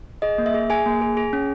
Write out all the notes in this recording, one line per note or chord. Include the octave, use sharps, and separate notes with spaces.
G#4 D#5
A#3
E5
G#4
G#4 G#5
A#3
G#4
G#4
C#4